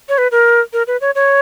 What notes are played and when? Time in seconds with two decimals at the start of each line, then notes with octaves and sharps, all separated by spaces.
0.09 C#5
0.18 B4
0.32 A#4
0.73 A#4
0.87 B4
1.01 C#5
1.15 C#5